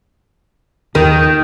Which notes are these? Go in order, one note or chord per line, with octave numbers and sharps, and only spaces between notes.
D#2 D#3